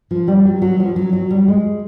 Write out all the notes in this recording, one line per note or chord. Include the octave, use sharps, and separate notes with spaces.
F3
G3
F#3
F#3
F3
F#3
F#3
G3
G#3